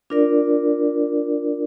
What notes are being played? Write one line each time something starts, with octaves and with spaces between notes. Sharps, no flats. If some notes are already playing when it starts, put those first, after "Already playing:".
D4 F4 A#4 D5